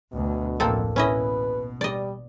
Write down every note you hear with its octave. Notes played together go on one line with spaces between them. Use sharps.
D2 B2
A1 F2 A#3 C4 A4
B2 C#4 E4 B4 D#5
G3 D5 D#5